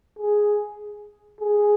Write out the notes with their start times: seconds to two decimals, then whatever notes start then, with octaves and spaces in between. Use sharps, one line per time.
0.19 G#4
1.41 G#4